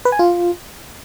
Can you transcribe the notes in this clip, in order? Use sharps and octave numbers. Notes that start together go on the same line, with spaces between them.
B4
G#5
F4